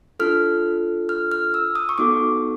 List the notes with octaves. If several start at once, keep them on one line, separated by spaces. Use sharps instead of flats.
D4 F4 A4 F6
F6
F6
E6
D#6
C#6
B3 D#4 F#4 A4 D6